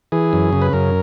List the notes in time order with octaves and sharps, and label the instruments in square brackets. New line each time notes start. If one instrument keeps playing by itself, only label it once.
[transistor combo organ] E3 G#4
F#2
C#3
B4
F#2 A#4